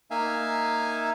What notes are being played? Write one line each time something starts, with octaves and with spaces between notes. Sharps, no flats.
A#3 D#4 E5 F5 G#5